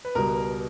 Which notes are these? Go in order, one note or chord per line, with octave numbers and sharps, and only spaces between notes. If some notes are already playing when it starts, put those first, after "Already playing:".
B4
C#2 B2 G3 A#4